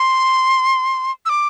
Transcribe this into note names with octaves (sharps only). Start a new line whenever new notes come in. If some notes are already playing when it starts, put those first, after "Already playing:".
Already playing: C6
E6
D6